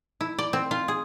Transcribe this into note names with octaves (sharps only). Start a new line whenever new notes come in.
E4
D5
C4
F4
G#4